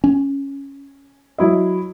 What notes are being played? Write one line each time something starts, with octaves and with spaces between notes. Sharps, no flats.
C#4
F#3 E4 D#5